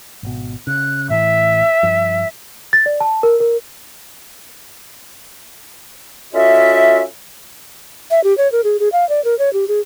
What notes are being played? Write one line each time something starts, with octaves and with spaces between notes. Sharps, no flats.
G#1 B2
C#3 F#6
A1 A2 E3 E5
G2 F3
A6
D5
A5
A#4
A#4
C#4 F4 F#4 A4 D#5 E5
E5
G4
C#5
A#4
G#4
G#4
F5
D5
A#4
C#5
G4
G#4